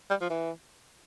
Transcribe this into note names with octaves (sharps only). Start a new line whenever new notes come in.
G3
F3
E3